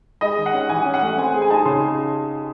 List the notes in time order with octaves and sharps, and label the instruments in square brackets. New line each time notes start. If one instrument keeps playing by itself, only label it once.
[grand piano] G#3 [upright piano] D#5
[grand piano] D#3
[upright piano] F#5
[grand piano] C#4
[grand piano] E3 [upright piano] G#5
[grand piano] C#4
[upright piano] F#5
[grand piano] A3
[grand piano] C4 [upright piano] G#5
[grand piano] G#4
[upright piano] G#5
[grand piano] D#4 [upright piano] A5
[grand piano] C#3 [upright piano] C6